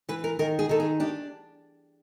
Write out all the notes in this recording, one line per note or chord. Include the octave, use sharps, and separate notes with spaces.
E3 B4
A#4
D#3 A#4
G#4
D#3 A4
G#4
D4 G4